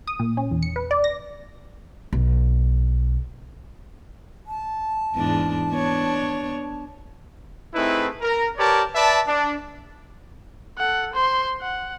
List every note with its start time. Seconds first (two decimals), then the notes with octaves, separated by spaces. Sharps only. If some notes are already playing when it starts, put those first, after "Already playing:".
0.07 D#6
0.19 A#2
0.37 C#4
0.51 E2
0.63 C#7
0.76 B4
0.91 D5
1.04 A#6
2.13 B1
4.47 A5
5.15 E2 G#2 D4
5.70 B3 D4 C#5
7.74 A3 C4 D#4 E4 G#4 B4
8.21 A#4 A#5
8.57 G4 A#4 B4 C#5 D5 A5
8.95 B4 D5 E5 A5
9.27 D4
10.78 A4 F#5
11.14 C5 C6
11.62 F#5